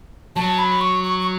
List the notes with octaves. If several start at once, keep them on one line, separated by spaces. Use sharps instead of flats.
F#3 A5
B5
C#6
C#6
C#6